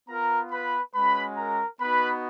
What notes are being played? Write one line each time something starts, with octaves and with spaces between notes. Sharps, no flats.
B3 F4 A#4 A#5
B4 B5
G#3 C#4 F#4 B4 B5
A#4 A#5
B3 D#4 F#4 B4 B5